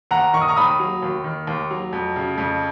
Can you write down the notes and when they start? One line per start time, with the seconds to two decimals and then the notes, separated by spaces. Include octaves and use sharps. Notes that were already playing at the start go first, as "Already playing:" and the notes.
0.11 D#2 F#5 A#5
0.33 D#3 C#6
0.41 D#6
0.48 A#5 C#6
0.56 D#2 B5 D#6
0.80 F#3
1.02 D#2
1.24 D#3
1.47 D#2
1.71 F#3
1.93 F2
2.16 C#3
2.38 F2